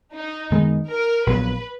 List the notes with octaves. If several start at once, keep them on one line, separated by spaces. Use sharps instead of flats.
D#4
F#2 D#3 G#3 B3
A#4
A#1 A#2 F#3 B3 B4